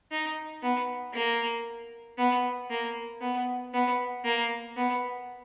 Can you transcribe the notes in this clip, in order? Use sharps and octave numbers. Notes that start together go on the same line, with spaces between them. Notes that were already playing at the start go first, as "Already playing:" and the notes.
D#4
B3
A#3
B3
A#3
B3
B3
A#3
B3